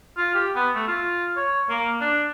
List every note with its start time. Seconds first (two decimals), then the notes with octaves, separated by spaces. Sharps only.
0.17 F4
0.35 G4
0.55 B3
0.75 A3
0.88 F4
1.37 C#5
1.69 A#3
2.00 D4